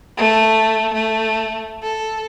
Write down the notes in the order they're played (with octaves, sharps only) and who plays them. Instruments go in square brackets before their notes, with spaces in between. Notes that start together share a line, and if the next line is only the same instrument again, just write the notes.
[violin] A3
A3
A4